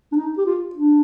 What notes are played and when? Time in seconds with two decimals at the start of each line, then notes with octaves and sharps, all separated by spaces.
0.12 D4
0.16 D#4
0.38 G4
0.46 F4
0.75 D4